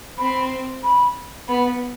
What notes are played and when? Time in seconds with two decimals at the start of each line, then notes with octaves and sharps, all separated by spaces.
0.18 C4 B5
0.83 B5
1.48 B3 B5